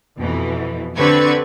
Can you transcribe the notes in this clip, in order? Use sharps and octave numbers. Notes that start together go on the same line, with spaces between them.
F2 B2 E3
D3 C4 G4 B4 C#6 G#6